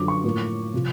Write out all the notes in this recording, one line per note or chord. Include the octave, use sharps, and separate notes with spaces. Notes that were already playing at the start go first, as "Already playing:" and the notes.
Already playing: F#2 D3 F3 D6
C#6
A2 F3 A#3
C3 F3